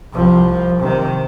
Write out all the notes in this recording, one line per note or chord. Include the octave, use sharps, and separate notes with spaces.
C2 F3
C3 D#3